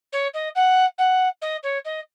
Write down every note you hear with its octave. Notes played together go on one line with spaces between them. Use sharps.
C#5
D#5
F#5
F#5
D#5
C#5
D#5